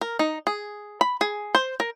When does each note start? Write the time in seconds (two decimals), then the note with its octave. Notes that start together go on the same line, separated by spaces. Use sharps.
0.01 A#4
0.19 D#4
0.47 G#4
1.01 B5
1.21 G#4
1.55 C5
1.80 A#4